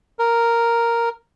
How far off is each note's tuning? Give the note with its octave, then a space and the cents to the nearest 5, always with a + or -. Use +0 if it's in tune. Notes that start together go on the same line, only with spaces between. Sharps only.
A#4 +0